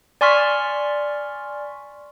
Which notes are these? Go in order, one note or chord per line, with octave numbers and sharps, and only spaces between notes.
D5 G#5 C6 C#6 F6 B6